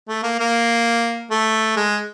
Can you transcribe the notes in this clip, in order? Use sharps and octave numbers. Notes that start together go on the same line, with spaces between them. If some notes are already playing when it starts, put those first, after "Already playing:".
A3
A#3
A#3
A3
G#3